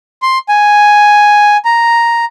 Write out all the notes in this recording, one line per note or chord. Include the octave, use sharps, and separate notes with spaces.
C6
G#5
A#5